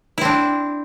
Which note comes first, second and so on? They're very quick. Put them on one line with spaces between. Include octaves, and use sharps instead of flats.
E4 C4 D4